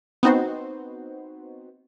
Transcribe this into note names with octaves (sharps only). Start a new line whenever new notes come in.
B3 C4 D#4 F#4 C5